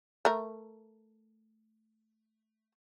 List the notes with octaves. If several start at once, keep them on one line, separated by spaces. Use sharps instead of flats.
A3 A#4